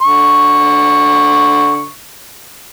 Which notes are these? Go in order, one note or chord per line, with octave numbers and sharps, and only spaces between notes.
D3 C#6